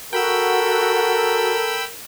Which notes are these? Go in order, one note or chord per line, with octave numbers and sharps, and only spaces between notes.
F#4 A4 A#4 G5 B5 E6